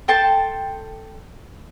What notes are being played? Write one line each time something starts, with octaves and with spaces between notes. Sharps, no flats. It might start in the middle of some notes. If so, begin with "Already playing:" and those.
A4 G5 A5 C6